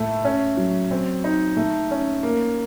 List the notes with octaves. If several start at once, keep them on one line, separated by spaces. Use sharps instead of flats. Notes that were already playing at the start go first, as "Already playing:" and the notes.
Already playing: A2 A3 A4
C#4
F#3
C4
D#4
A3
C#4
A#3